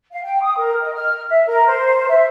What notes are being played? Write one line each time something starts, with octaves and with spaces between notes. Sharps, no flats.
F5
G5
D#6
A#4
D#5
F6
E5
A#4
C5
E5